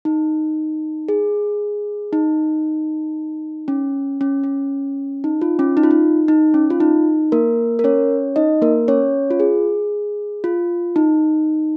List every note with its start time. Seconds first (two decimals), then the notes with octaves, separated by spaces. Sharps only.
0.05 D#4
1.08 G#4
2.13 D#4
3.68 C#4
4.21 C#4
4.44 C#4
5.24 D#4
5.42 F4
5.59 C#4
5.77 D#4
5.83 F4
5.91 D#4
6.28 D#4
6.54 C#4
6.70 F4
6.80 D#4
7.32 A#3 A#4
7.79 A#4
7.84 C#4 C#5
8.36 D#4 D#5
8.62 A#3 A#4
8.88 C#4 C#5
9.31 F4
9.40 G#4
10.44 F4
10.96 D#4